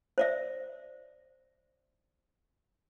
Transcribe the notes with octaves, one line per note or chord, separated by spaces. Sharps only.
C5 D5 E5